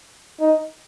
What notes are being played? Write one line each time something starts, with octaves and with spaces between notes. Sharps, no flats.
D#4